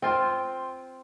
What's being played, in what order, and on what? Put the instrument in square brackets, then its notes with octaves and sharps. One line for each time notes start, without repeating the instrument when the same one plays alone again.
[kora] C4 F4 [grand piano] G5 C6